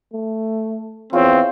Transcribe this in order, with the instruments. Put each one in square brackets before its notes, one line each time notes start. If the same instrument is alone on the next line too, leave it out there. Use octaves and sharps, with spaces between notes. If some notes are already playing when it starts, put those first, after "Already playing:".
[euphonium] A3
[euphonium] E2 [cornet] C4 [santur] F4 C#5